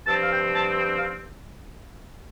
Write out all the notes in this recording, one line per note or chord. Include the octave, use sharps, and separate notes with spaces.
G2 F3 C4 A5
F5
G5
A5
G5
F5